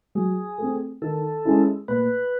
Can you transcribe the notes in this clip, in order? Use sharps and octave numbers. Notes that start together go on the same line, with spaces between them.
F#3 G#4
A3 C4
D#3 A4
G#3 C#4 E4
A#2 B4